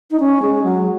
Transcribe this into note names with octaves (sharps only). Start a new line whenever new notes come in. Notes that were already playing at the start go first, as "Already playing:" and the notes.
D#4
C#4
G#3
F#3